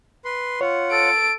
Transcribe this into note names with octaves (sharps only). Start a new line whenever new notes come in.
B4 C6
F4 C#5 F#5
A4 D7